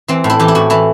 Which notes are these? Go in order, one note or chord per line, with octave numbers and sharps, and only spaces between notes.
E3 C4
A2
E4
E3 G4
E4
A2 F#4
E3 E4